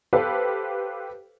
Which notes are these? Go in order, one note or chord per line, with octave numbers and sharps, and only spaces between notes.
G4 A4 B4 C5 F5